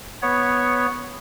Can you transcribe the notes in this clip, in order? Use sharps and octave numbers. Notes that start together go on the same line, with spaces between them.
B3 C#5